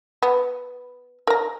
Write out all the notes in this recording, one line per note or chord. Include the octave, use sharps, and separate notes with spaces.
B3
A#4 A#5